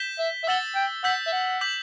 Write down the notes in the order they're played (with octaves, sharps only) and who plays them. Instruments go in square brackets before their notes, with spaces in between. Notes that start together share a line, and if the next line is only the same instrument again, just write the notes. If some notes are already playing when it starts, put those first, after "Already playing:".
Already playing: [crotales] G6 B6 E7 G7
[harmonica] E5
E5
[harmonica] F#5 [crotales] E6 A6 E7 G7
[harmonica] G5
[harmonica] F#5 [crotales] E6 G6 B6
[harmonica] E5
F#5
[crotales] D6 G6 B6 F#7